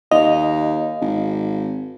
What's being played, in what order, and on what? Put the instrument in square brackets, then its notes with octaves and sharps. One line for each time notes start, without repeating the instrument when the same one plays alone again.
[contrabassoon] D#2 [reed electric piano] D#5 [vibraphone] F5
[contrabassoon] G#1